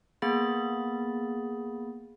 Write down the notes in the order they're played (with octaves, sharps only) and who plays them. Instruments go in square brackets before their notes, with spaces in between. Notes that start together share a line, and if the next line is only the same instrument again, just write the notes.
[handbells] A#3 B3 G#4 B5 A6